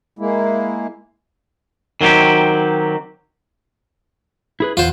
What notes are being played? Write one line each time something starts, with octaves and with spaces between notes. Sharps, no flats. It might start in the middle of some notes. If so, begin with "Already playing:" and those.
G#3 A#3 E4
D#3 F#3 C4 G4
E4 G#4 B4
E2 F4 C5 F#5